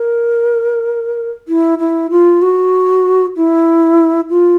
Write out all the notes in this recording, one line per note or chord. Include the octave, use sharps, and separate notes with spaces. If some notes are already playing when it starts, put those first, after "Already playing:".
Already playing: A#4
E4
E4
F4
F#4
E4
F4